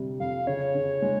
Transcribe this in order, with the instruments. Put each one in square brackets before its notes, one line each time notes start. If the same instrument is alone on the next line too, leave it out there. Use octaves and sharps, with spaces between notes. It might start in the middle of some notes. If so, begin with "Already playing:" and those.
Already playing: [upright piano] C3 G3
[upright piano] F2 [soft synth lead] F5
[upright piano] C#3 [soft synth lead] C#5
[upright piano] C#3
G#3